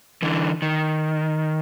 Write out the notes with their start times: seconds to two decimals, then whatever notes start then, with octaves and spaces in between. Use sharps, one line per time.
0.22 D3 E3
0.62 D#3